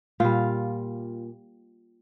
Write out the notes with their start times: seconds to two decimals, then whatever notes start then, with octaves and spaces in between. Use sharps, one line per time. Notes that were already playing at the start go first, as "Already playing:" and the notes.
0.20 A#2 G3 F4